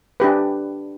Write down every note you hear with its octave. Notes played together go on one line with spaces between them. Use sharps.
D4 G4 B4